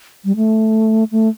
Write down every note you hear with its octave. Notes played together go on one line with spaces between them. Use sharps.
G3
A3
A3